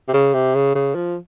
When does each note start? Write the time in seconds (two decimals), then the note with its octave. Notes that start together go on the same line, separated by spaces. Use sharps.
0.08 C3
0.14 C#3
0.34 C3
0.55 C#3
0.75 C#3
0.95 F3